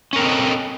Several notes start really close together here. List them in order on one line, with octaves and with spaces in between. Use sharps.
C#4 A#4 C4 A4 D#5